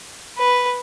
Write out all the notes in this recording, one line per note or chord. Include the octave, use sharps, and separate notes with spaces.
B4